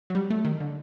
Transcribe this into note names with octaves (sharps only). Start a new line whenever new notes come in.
F#3
G3
A3
D#3
D3